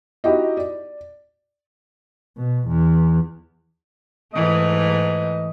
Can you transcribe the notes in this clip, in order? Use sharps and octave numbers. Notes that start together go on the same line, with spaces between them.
D#4 E4 F#4 G4 D#5
D5
B2
E2
G#2 E3 A3 D#5